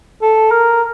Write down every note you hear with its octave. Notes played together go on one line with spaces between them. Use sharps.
A4
A#4